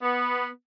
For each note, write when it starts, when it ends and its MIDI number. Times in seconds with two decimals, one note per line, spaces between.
0.02 0.46 59